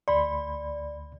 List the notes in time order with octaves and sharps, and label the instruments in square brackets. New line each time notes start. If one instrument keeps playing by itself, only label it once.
[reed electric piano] D2 B5 C6 [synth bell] D5